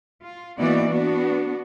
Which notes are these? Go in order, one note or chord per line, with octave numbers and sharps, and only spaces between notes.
F4
E3 A#3 B3 D#4 F#4 D5
B3 D4 F#4